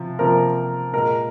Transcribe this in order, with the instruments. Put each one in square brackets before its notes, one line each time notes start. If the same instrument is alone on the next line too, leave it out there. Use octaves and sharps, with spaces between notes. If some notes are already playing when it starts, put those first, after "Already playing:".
Already playing: [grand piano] C3 F3
C3 F3 A#3 A#4
A#2 G#3 A#4